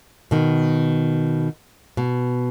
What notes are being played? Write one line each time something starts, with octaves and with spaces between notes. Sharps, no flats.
B2 D#3
B2